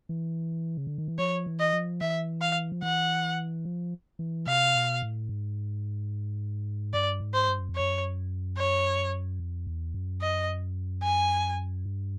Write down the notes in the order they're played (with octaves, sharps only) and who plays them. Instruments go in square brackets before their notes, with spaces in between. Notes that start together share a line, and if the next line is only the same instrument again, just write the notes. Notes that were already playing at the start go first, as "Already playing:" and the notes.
[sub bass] E3
C#3
D3
D#3
E3
[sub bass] F3 [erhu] C#5
[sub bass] E3
[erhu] D#5
[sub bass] F3
[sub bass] E3 [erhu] E5
[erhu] F5
[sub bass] F3
[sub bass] E3 [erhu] F#5
[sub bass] F3
E3
[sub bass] C3 [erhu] F5
[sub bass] B2
A2
G#2
[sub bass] G2 [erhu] D5
[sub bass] G#2
[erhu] C5
[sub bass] G2
F#2
F2
[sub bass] F#2 [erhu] C#5
[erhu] C#5
[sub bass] F2
E2
F#2
[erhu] D#5
G#5
[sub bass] G2